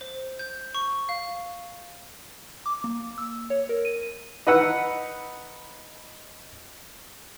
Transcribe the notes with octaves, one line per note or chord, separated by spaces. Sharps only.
C5
G6
C#6
F5
D6
A#3
E6
C#5
A#4
D#7
D#4 B4 F#5 E6